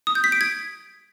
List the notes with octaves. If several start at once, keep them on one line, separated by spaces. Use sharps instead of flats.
D#6
G6
B6
D7
G#6